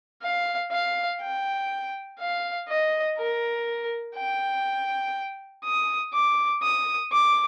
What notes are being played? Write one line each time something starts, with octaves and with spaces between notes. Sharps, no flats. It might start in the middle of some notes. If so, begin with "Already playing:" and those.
F5
F5
G5
F5
D#5
A#4
G5
D#6
D6
D#6
D6